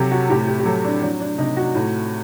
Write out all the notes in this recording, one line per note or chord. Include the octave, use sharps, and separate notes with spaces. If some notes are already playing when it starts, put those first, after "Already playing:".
Already playing: C3 F#3 G4 A4
F#4
A2 G4
G4
G4
F#3 A4
D4
F#3 D4
D4
C3 D#4
F#4
A2